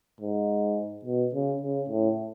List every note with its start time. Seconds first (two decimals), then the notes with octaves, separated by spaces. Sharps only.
0.21 G#2
1.05 B2
1.34 C#3
1.62 C#3
1.89 A2